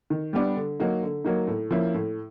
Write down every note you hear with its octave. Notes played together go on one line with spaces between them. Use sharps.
D#3
G3 B3 D4
D3
F#3 A#3 D#4
D3
F#3 A#3 D#4
A2
F3 A#3 C#4 E4
A2